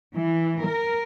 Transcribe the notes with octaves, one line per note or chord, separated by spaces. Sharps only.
E3
A#4